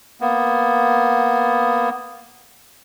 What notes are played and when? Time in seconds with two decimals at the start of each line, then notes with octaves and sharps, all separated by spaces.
0.21 A#3 B3